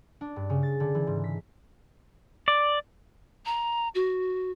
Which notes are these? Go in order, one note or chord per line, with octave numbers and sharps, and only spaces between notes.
D4
G2
C#3
A6
D3
E3
G#2
B6
D5
A#5
F#4